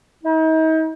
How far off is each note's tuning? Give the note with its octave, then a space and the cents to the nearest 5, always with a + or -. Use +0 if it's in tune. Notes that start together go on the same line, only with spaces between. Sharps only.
D#4 +40